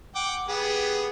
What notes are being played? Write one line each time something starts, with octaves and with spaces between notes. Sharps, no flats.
F#5 G5 D6
B3 G4 G#4